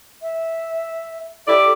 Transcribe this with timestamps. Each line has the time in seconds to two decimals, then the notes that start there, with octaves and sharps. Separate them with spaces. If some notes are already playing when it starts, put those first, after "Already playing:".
0.22 E5
1.47 E4 G4 A4 D5